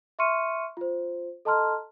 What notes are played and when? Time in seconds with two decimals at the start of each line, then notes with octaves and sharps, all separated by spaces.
0.19 E5 C6 C#6 F6 C#7 D#7
0.77 F4 C5
1.45 A4 D#5 A5 A#5 C6 F6